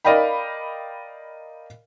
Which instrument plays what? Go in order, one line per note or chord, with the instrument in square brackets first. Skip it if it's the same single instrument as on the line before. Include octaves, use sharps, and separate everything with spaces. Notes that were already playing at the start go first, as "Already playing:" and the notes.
[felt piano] A#4 D5 D#5 F5 G5 B5